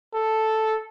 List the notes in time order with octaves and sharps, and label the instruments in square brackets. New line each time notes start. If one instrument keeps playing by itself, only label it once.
[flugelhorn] A4